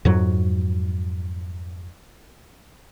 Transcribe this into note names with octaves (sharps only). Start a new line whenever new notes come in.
F2 G#2 F#3